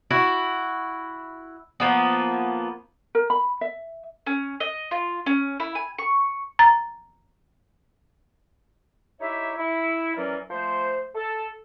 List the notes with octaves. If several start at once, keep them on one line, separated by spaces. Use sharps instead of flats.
E4 F#4
F3 A#3 B3
A#4
B5
E5
C#4
D#5
F4
C#4
E4
G#5
C#6
A#5 A6
D#4 E4 G4 C#5 E5
E4
E3 F#3 C#4 A#4 D5
F3 A3 C5
A4